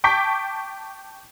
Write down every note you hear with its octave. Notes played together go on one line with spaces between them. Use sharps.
G5 A5 C#6 D6 G6 B6